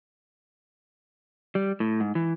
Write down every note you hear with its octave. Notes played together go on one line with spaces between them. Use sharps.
G3
A2
G#2
E3